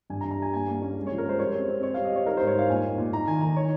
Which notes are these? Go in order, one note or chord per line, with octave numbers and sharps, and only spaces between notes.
G2 G#5
A#5
G2
A#5
G2 G#5
A#3 G#5
A#3
C#4
G#3
F3 C#5
A#4
G#3 C5
G3 C#5
C4
C4
G3 C#5
G3 F5
D#5
G3 C#5
D#4 A#4
G#2 C5
C#5
D#4 F5
A#2 G#5
D#4
A#2
D#4 A#5
D#3 G#5
D#3 A#5
D#4 C#5